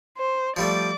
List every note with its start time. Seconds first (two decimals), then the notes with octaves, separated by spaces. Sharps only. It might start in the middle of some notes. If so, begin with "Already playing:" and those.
0.18 C5
0.56 F3 G3 A3 D5 D6